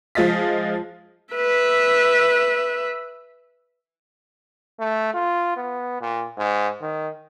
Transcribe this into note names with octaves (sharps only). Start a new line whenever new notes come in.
F3 G#3 F4 D#5 A6 B6
B4 E5
A3
F4
B3
A#2
G#2
D#3